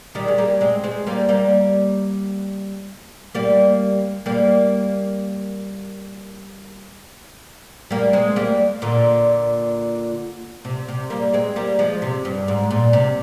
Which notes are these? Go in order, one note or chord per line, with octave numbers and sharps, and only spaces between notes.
D#3 G3
G#3
G3 A#3
G#3 C4
G#3 C4
G3 A#3
G3 A#3
G3 A#3
G3 A#3
G3 A#3
G#3 C4
G3 A#3
A#2 D3
C3
C3
G3 A#3
G#3 C4
G3 A#3
F3 G#3
C3
G2
G#2
A#2
C3